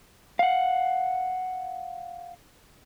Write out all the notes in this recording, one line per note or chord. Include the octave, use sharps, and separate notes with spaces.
F5 F#5